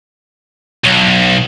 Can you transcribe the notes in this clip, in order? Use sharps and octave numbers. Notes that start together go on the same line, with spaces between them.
B1